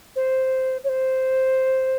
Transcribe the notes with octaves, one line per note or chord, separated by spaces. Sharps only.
C5
C#5
C5